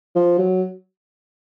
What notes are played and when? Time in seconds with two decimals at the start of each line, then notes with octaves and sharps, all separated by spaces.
0.16 F3
0.38 F#3